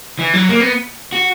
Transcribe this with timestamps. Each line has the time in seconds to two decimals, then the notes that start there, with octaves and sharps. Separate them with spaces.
0.19 E3
0.34 F#3
0.49 A#3
0.60 B3
1.13 F#4